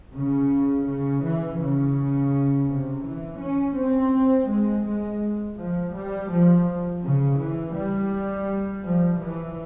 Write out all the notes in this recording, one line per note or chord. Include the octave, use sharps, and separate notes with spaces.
C#3
C#3
E3
C#3
C3
E3
C#4
C4
G#3
G#3
F3
G3
F3
C#3
E3
G3
F3
E3